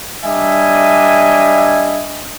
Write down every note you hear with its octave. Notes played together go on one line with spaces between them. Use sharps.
G3 D4 D#5 E5 G#5